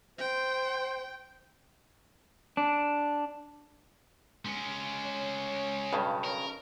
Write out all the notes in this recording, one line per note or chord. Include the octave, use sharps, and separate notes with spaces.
C5 G5
D4
G#3 C#4
C#5
B1 G2 C#3
C#4 A#4